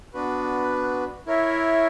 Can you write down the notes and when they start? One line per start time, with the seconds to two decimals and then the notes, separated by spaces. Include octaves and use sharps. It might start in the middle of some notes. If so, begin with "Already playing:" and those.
0.14 B3 D4 F#4 B4
1.27 E4 A#4 C#5 E5